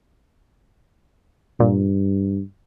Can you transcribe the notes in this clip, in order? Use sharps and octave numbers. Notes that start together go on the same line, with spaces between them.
G2 A#2